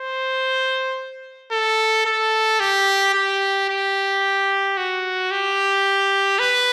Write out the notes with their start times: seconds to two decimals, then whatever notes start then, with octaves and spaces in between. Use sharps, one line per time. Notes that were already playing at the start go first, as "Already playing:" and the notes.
Already playing: C5
1.52 A4
2.05 A4
2.60 G4
3.14 G4
3.69 G4
4.77 F#4
5.31 G4
6.39 B4